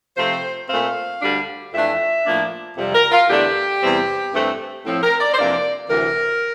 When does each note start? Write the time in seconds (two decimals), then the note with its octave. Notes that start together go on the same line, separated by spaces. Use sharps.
0.16 C3 F3 A3 C4 C5
0.68 A#2 A3 C4 F5
1.21 D2 D3 G3 D4
1.73 F2 E3 A3 D4 E5
2.26 A2 F3 A#3 D4
2.77 F2 C3 G3
2.94 A#4
3.12 F4
3.29 E2 D3 A3 D4 G4
3.82 E2 C3 E3 G3 C4
4.34 G2 E3 A3 C4
4.85 A2 F3 C4
5.03 A#4
5.20 D5
5.33 C5
5.37 F2 C3 E3 A#3 D4 D5
5.89 D2 C3 E3 A#4